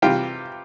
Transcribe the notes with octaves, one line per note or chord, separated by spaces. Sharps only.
C3 E3 G3 F4 G4